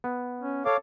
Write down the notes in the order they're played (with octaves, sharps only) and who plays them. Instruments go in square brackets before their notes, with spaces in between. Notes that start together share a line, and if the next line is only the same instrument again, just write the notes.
[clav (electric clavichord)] B3
[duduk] C#4
[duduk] A4 [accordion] C#5 F5 D6